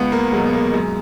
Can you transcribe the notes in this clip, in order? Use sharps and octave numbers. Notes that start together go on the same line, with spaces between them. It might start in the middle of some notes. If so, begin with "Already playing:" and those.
Already playing: C#2 B3
A#3
B2 F#3 G#3
B3
A#3
F#2 G#3